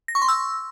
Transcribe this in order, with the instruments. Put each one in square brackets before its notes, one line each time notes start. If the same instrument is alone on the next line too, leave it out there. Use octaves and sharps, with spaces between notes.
[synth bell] A#6
C#6
C6
E6